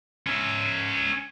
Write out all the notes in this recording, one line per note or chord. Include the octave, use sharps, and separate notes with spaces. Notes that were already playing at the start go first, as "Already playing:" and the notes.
C#4 E5